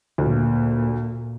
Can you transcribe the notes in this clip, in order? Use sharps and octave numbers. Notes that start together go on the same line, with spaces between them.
D2 A#2